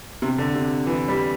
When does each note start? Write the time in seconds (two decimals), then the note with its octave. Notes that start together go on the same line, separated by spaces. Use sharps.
0.22 C3
0.38 D3
0.55 C3
0.86 E3
1.08 G3